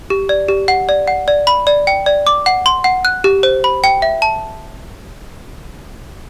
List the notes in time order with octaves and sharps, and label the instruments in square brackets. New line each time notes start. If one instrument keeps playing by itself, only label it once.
[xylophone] G4
D5
G4
F#5
D5
F#5
D5
B5
D5
G5
D5
D6
F#5
C6
F#5
F#6
G4
C5
B5
G5
E5
A5